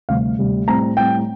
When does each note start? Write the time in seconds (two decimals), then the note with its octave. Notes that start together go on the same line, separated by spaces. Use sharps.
0.09 D2 C3 G3 F5
0.38 D2 C3 G3
0.68 A2 G3 C4 A#5
0.97 A2 G3 C4 G5